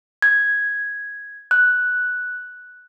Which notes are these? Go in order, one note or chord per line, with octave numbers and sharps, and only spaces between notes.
G#6
F#6